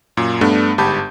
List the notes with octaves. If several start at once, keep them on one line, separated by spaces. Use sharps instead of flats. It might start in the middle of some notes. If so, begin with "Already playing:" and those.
F#2 A#2
G2 A3 B3 D4
G1 G#2 G4 A5 B5 G6